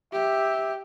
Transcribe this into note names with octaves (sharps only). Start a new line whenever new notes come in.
G4 E5